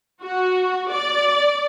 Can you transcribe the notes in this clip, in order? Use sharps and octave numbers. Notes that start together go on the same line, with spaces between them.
F#4
D5